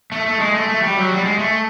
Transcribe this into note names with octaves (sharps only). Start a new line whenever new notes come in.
A3
A3
G#3
A3
A3
G3
F#3
G3
G#3
A3